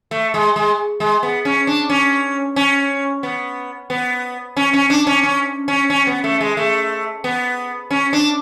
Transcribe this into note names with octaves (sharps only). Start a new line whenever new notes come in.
A3
G#3
G#3
G#3
B3
C#4
D4
C#4
C#4
B3
B3
C#4
C#4
D4
C#4
C#4
C#4
C#4
B3
A3
G#3
A3
B3
C#4
D4